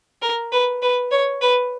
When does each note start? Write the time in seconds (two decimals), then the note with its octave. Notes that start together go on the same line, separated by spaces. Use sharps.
0.22 A#4
0.52 B4
0.82 B4
1.11 C#5
1.41 B4